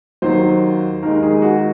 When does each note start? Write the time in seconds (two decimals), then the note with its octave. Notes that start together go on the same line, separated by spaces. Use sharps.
0.22 D#2 D#3 F#3 C5
1.02 D#2 D#3 G#3 A#4
1.23 G#4
1.42 F#4